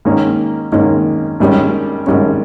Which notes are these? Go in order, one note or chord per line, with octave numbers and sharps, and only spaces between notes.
G#2 D#3 A#3 C#4
G#2 D#3 A#3 C#4
A#1 G#2 G3 C#4
A#1 G#2 G3 C#4